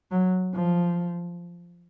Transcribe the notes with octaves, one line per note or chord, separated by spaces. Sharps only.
F#3
F3